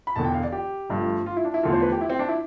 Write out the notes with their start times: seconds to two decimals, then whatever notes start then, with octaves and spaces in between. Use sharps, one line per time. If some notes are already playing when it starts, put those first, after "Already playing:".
0.07 B5
0.16 E1 E2 D3 A5
0.24 G5
0.34 F5
0.44 D5
0.52 G4
0.90 G1 G2 F3 A3
1.26 F4
1.36 E4
1.45 D4
1.54 E4
1.63 E2 D3 F3 A3 F4
1.73 C5
1.82 B4
1.92 G4
2.01 E4
2.09 C4
2.19 D4
2.29 E4